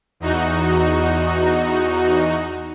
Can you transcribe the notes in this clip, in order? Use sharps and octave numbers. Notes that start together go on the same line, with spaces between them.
E2 D#4 F#4